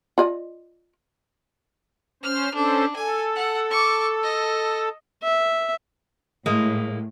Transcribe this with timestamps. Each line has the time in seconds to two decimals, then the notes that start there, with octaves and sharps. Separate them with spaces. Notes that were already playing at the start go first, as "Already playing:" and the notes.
0.18 F4 D5 D#5
2.23 C#4 C5 F6
2.54 C#4 D4 A4 C5
2.96 A4 G#5
3.35 F#5
3.70 C#6 D6
4.23 D#5
5.23 E5
6.46 A2 G#3 A#3